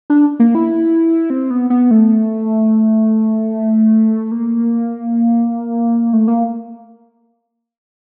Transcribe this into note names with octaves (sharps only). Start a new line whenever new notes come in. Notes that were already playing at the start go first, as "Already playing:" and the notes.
D4
A#3
E4
C4
B3
B3
A3
A#3
A3
A#3